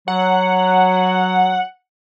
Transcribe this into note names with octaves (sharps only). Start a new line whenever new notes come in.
F#3 F#5